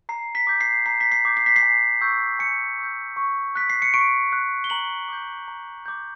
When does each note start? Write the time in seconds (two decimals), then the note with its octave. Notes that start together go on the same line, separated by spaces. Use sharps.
0.09 A#5 C7
0.35 B6
0.47 D6 G6
0.61 C7
0.86 A#5 C7
1.01 B6
1.12 C7
1.25 D6 G6
1.37 C7
1.46 B6
1.56 C7
1.63 G#5
2.01 C#6 E6 G6
2.39 G#5 C#7
2.78 C#6 E6 G6
3.16 C#6
3.55 F#6 B6
3.70 C7
3.82 C#7
3.94 C#6 D7
4.33 F#6
4.64 G7
4.70 A#5 F#7
5.09 D6 G6
5.48 A#5
5.86 D6 G6